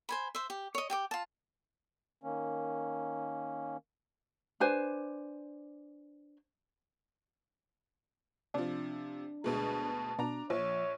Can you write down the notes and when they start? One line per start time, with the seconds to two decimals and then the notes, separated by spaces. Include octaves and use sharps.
0.09 C5 G#5 B5
0.35 C5 E5
0.50 G4
0.75 C#5 D#5
0.90 G4 G5 D6
1.11 F4 A5
2.24 D#3 A#3 C#4
4.60 D4 B4 C5 G#5
8.54 C3 F3 D4
9.44 D2 B2 G#3 A5
10.19 B2 D4 A#5
10.50 A#1 F3 C#5